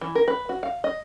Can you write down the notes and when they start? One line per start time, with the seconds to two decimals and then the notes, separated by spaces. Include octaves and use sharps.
0.01 E3
0.15 A#4
0.28 B4
0.49 F#4
0.63 F5
0.84 D#5